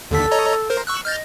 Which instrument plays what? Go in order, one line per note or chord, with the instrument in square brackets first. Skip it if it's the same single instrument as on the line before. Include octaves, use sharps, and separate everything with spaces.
[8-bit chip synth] D#2 D3 B6 [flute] A4
[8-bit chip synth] C#5 D#5 A#5
A#4 C5
C#6 E6 F#6
[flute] D#5 [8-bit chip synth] F6 G6 A6